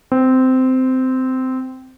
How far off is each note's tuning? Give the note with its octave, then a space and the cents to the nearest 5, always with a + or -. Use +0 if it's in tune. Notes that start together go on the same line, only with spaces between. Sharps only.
C4 -15